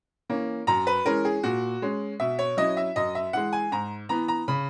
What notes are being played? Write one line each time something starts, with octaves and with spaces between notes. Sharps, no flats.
E3 A#3 C#4
F#2 A#5
B4
E3 G#3 C#4 A#4
G#4
A#2 F#4
G#3 C#4
B2 E5
C#5
F#3 C#4 E4 D#5
E5
F#2 D#5
E5
E3 G#3 F#5
G#5
G#2 A#5
E3 B3 A#5
A#5
C#3 B5